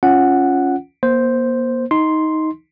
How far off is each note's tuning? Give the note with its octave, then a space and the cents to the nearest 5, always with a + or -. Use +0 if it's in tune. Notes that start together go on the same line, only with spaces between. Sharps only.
C#4 +0 F4 -5 F#5 +0
A#3 +35 C5 +0
D#4 +15 C6 +0